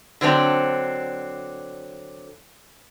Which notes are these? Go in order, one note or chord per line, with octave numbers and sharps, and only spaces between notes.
D3 F#3 C4 D4